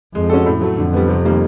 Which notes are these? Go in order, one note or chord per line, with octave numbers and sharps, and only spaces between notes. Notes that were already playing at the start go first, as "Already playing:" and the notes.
F2 G#3
C#4 F#4 A4
A2
F#3 A3
F2 D3
G3 B3
C3
D#3 G3 A#3